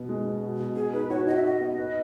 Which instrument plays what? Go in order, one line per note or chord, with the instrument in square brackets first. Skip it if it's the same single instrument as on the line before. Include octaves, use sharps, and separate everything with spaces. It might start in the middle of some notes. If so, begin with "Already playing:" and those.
Already playing: [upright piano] B2 B3
G#3
B3
B2
B2
[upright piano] B3 [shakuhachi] G#4
[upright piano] D#4 [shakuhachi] B4
[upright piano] F#4 [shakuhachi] C#5
[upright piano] F#4 [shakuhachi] D#5
[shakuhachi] E5
[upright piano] F#4 [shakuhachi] D#5
[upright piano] B3
B4